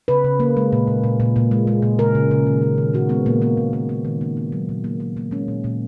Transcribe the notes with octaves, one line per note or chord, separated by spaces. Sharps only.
C#3 B4
C#3
A#3
G#3
A#2
A#2
A#2
A#2
A#2
G#3
G#3
A#2
C#3 A#4
C#3
C#3
D#3
G#3
D#3
A#2 F#4
G#3 B3
A#2 A#3
A#3 B3
A#2
A#3
A#3
D#3
A#3
A#3
F#3
A#2
A#3
A#3
A#3
G#3 C#4
A#2
A#2